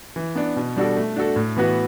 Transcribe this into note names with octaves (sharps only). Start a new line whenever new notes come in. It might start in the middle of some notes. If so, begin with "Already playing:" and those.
E3
B3 D4
B2
G3 D4 F#4 A4
A3
D4 F#4 A4
A2
E3 B3 F#4 B4